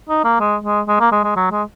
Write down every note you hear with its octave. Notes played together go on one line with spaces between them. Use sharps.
D#4
A#3
G#3
G#3
G#3
A#3
G#3
G#3
F#3
G#3